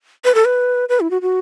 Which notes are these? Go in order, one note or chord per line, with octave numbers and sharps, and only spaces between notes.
B4
A4
B4
B4
E4
F#4
F#4